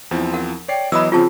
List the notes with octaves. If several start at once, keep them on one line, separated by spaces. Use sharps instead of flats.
E2 F3 C4 E4
A#4 F#5
C#5 D5 G5 C7
E3 F#3 B3 D#5 B5 D#6 E6
C#3 F3 C4 F4 G#4 A5